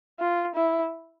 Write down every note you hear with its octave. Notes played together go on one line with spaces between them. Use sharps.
F4
E4